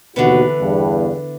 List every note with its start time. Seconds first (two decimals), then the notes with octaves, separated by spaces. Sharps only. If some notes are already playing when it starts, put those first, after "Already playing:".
0.16 D#2 B2 D3 E3 B3 F#4
0.60 E2 G2